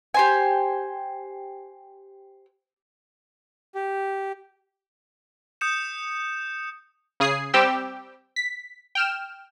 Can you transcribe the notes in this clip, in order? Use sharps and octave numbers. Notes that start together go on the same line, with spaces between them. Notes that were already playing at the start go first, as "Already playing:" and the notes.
G4 C5 G#5
G4
D#6 G6 C#7 E7
C#3 G#4 D#6 C7
G3 C4 G4 G5 E6 E7
B6
G5 F6 E7